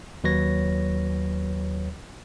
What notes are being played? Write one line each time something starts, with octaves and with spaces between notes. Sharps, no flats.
D#2 F#3 B4 C#5 A#6